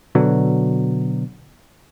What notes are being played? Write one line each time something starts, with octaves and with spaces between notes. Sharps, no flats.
B2 D3 F#3